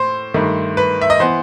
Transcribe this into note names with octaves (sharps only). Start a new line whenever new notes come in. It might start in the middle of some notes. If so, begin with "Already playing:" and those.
Already playing: A2 C5
G2 D#3 A3
B4
E5
D#5
E3 B3 C5